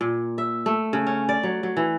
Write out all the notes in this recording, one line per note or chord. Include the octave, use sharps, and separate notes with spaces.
A#2
E5
A3
C#3
C#4
D5
F#3
F#3
E3